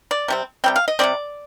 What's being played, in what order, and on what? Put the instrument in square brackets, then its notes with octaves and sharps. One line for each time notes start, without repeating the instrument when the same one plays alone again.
[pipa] D5
C3 G3 C4
C3 G3 C4 G5
F5
D#5
C3 G3 C4 D5